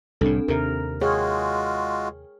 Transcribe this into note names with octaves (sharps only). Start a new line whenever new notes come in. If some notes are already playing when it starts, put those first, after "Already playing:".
C2 A2 C4 D4 A4
D#2 C3 A#4
G#3 F4 F#4 G#4 C#5 G5 C#6 F6